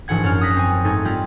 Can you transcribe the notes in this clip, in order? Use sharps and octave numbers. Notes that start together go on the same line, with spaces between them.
A#1 G#2 E3 F#5 G#6
F#2 C#4 F6
D#6 F#6 A#6 B6
C4 G#5
G#2 A3 D#4 G#6
G3 C4 F4